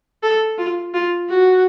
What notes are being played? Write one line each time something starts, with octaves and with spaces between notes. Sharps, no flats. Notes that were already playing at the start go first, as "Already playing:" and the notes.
A4
F4
F4
F#4